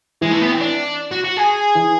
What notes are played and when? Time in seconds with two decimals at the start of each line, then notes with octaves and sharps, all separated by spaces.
0.21 E3 G#3
0.32 A3
0.41 B3
0.51 C4
0.60 D4
1.11 F#4
1.24 F#4
1.37 G#4
1.75 E3